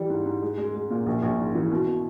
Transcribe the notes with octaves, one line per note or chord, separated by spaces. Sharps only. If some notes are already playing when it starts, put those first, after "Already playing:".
Already playing: E3 G3
G#2
G#2
G#3
G#3
G#3
A#2
A#1
A#1
G#2
E3
B2
B2